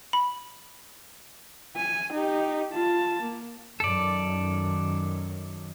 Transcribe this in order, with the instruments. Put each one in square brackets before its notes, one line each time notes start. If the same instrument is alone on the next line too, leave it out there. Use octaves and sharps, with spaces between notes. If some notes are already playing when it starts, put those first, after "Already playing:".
[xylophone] B5
[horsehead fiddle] G#5
D#4 G4
F4 A5
A#3
[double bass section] F#2 D#3 [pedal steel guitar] A4 D5